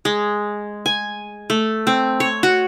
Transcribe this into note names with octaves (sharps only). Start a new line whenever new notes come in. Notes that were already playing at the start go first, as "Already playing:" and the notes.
G#3
G#5
A3
C4
C#5
F#4